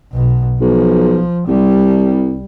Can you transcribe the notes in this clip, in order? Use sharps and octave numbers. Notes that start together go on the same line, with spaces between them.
B1 B2
B1 F3
C2 G3